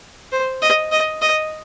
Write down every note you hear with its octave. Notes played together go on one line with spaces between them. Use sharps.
C5
D#5
D#5
D#5